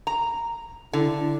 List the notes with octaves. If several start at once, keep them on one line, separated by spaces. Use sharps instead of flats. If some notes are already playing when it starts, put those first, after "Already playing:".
A#5
D3 E4